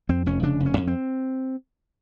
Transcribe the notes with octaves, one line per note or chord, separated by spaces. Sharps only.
F2 C4
F1 C#4
C#3 D4
F1
C#4
F2
C4